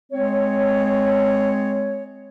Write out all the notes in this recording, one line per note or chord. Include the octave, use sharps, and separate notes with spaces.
G#3 C4 C#5